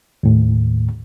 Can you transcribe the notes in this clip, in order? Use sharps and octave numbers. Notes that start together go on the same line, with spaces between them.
D#2 A2